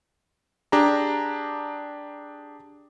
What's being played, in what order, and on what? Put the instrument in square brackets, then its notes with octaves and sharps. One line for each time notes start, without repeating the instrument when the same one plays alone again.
[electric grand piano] D4 G4 G#4 A#5